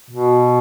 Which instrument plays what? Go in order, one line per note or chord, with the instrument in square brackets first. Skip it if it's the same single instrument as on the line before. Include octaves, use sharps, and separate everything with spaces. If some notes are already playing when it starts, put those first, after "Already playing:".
[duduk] B2